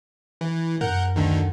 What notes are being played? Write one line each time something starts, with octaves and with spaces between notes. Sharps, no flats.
E3
F#2 A#4 F#5 G6
D2 D3 D#3